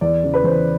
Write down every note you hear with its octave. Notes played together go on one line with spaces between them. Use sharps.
E2 D5
C#3 E3
B4
E2 C5